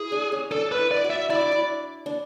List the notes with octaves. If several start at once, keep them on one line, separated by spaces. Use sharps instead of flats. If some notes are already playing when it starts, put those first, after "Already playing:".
Already playing: E4 G#4
D4
C#4
D4 A4
B4
E4
D5
F#4
E5
E4 D5
D4
E4
D4